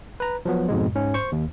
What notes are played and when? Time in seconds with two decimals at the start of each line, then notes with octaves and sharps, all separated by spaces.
0.20 B4 A#5
0.45 F3 F#3 B3
0.69 F2 G#2 B2 G#3
0.95 G#2 C#4
1.14 C5 C#6
1.32 D#2